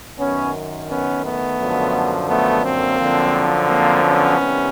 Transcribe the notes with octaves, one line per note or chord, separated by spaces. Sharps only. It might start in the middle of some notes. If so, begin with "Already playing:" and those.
F#2 D#3 B3 C#4
B3 C#4
A3 B3
F#2 D3 F3
A3 B3
A#3 C4
F#2 D3 F3
A#3 C4
B3 C#4
C2 C3 D#3